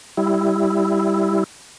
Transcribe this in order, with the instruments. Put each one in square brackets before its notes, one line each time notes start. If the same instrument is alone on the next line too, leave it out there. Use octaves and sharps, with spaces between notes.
[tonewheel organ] G3 E4